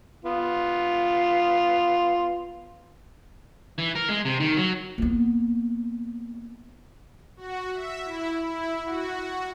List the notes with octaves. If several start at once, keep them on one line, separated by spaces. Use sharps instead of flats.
B3 F4
E3
A#4
G#3
C3
D#3
F#3
A#3 B3
F#4
E5
E4
E4
F#4